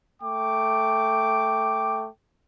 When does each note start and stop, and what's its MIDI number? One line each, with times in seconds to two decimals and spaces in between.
0.22 2.08 57
0.22 2.08 79
0.22 2.08 86